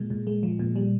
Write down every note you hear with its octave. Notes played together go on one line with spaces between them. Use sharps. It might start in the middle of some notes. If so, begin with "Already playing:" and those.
Already playing: A#2 G#3
A#2
G#3
F3
A#2
G3